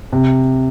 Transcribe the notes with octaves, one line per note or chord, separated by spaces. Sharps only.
C3